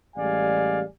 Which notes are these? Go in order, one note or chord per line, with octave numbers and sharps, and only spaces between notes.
A1 G3 G#3 D5 F5 G#5